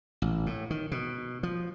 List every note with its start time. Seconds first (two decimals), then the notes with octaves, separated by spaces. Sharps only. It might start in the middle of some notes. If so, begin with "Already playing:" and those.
0.22 A1
0.46 A2
0.70 D#3
0.92 B2
1.43 F3